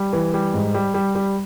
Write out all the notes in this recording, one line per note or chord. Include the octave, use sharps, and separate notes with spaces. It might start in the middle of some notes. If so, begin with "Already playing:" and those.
Already playing: G3
E3
G3
G#2
G3
G3
G3